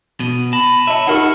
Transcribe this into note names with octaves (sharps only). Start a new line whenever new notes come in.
B2 D#7
A5 B5 A#6 F#7
C#5 D#5 E5 A5
D#4 E4 G4 A#4 F#5 F6 C#7